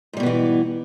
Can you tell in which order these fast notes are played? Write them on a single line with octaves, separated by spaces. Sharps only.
G#2 G3 B2 B3 E3